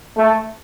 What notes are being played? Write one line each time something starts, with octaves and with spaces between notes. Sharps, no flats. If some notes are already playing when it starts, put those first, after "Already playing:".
A3